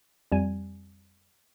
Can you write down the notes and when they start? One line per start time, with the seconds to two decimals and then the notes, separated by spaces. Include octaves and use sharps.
0.32 F2 G3 G#5